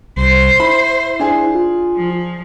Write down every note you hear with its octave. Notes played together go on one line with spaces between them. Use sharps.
C2 C5
E4 B5
D4 G#4
F4
F3